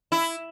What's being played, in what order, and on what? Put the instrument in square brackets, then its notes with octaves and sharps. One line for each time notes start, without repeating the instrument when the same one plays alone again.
[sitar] E4